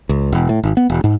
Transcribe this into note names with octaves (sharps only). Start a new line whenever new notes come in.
C#2
E1
A2
G#1
B3
E1
G#2